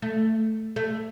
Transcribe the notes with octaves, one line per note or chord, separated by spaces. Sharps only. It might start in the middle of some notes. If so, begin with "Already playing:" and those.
A3
A3